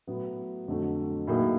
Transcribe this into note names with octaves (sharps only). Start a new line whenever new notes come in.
A2 F#3 B3
F2 D3 F#3 A3
A2 F#3 A#3 D#4 G#4